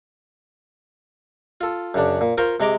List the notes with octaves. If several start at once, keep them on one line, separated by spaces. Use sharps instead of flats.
F4 A4
F#2 C#3 D4
A#2
F4 A#4 C5 F5 C#6
C3 G#3 A#5 D6